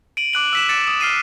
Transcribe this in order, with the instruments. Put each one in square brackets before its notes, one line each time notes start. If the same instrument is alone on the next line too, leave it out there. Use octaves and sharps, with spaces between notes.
[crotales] D7 D#7 F#7
D6 F#6 F#7
E6 B6 E7
D6 A6 C#7 D7 E7
D#6
F6 C7 D#7